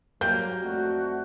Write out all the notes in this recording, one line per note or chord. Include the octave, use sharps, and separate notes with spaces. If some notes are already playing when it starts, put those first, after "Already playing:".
F#3 G3 A#3 G5 G6
F2 A3 F#4 D5